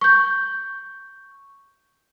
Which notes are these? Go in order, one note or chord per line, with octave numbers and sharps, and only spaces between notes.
C#6 G6